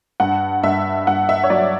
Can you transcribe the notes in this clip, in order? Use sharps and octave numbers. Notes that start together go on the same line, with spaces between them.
G2 F#5
G2 E5
G2 F#5
E5
C#5
F#3 D5